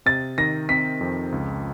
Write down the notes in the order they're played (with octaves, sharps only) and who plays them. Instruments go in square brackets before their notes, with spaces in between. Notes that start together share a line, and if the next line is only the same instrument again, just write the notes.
[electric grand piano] C3 [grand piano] A6
[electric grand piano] D#3 [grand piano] A#6
[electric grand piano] C4 [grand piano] B6
[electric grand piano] F2
C#2